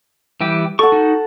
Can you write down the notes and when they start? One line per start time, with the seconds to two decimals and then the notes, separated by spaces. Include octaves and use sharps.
0.41 E3 G3 G4
0.79 A4 F#5 C#6
0.92 D#4 F#4